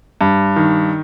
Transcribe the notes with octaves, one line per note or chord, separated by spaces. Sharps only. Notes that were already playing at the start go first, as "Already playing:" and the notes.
G2
D#3